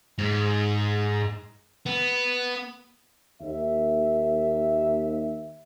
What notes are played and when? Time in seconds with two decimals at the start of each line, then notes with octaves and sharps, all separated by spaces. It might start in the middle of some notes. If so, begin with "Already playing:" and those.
0.18 G#2
1.86 B3
3.41 D#2 E5